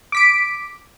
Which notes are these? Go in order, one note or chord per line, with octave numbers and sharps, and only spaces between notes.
D6 B6 D7